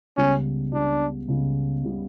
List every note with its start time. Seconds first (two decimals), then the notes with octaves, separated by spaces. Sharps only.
0.17 C#2 C#3 G3 B3 C#4
0.72 C#2 C#3 G3 B3 D4
1.28 C#2 C#3 G3 B3
1.84 C#3 G3 B3